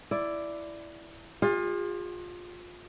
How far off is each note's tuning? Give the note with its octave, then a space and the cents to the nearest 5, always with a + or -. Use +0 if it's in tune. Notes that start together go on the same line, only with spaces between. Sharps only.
E4 +10 D5 +0
F4 +25 G#4 -40